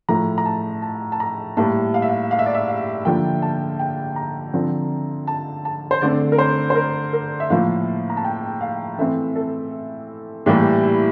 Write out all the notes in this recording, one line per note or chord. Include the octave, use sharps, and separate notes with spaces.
A2 F3 A3 A#5
A#5
A5
A5
A5
A#5
A2 G3 A#3 A5
F5
E5
F5
F5
E5
D5
E5
F5
D3 F3 A#3 G5
A5
G5
A#5
D3 F3 C4
A5
A5
C5
D3 A3 C4 D5
A#4
C5
C5
A#4
A#4
E5
A2 F3 A#3 F5
A#5
A5
G5
F5
E3 A3 C4 E5
A4
A2 E3 G3 A#3 G4
E4